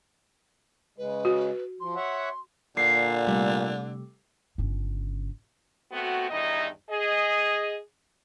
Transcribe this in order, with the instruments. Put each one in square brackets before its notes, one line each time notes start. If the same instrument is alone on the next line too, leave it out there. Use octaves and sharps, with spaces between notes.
[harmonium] C#3 G#3 [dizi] B4
[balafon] F#4
[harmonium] F3 [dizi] C6
[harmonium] C#5 E5 F#5
[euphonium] A#2 [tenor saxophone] D3 [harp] C7
[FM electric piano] C3 G3 A3
[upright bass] G1 C#3
[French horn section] A3 B3 C4 F#4
E2 G2 D#3 D#4 E4 D#5
G#4 D#5